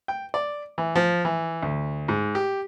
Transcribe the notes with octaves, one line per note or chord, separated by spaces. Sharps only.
G5
D5
E3
F3
E3
D2
G#2
G4